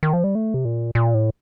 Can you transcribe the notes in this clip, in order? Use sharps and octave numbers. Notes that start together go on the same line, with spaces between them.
D#3
F3
G3
A3
C3
A#2
A#2
A2